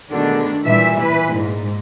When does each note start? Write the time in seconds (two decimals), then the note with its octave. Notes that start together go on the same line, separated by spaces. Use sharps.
0.11 B2 D3 D#3 G#3 A3 D4
0.65 A#2 E3 G3 E5
1.01 A#2 B4
1.34 G#2